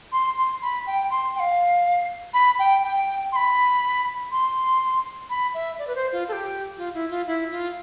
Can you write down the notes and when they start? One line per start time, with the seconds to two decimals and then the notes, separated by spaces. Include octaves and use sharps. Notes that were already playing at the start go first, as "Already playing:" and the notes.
0.12 C6
0.38 C6
0.62 B5
0.87 G5
1.11 C6
1.36 G5
1.40 F5
2.34 B5
2.59 G5
2.84 G5
3.32 C6
3.36 B5
4.31 C6
5.30 B5
5.54 E5
5.79 D5
5.87 B4
5.95 C5
6.12 F4
6.28 A4
6.32 G4
6.78 F4
6.94 E4
7.10 F4
7.27 E4
7.51 F4